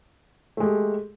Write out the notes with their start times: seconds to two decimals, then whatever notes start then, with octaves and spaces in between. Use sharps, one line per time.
0.57 A3
0.60 G#3
0.63 G4